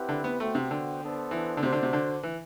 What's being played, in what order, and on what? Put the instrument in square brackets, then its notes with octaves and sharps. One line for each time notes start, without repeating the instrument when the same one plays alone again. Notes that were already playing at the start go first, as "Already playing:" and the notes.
Already playing: [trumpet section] C4 E4 G4 B4 F#5
[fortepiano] D3
B3
[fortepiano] A3 [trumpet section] B3 F#4 C5 G5
[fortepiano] C3
D3
[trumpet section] B3 D4 A4 C5
[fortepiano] E3
D3
[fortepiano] C3 [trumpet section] D4 F#4 C5
[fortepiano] D3
C3
D3
E3